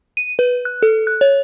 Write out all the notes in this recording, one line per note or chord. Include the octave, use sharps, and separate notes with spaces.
D#7
B4
F#6
A4
F#6
C#5